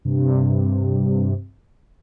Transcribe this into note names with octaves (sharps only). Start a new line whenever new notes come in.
G2 C3